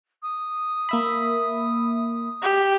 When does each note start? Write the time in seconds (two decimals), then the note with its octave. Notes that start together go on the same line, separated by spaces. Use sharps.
0.23 D#6
0.89 A#3 E5 B5
2.43 G4